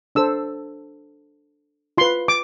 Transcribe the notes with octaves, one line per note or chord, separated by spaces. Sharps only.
D4 A4 C5 E6
F4 B4 C6
D6